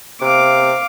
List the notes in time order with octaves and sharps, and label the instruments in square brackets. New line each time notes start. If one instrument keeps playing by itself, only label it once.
[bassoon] C3 [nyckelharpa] F5 D6